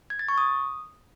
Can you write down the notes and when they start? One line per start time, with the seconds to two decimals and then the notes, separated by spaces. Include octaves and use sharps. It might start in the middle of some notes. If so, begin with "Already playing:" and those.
0.10 G#6
0.19 A6
0.28 C#6
0.38 D#6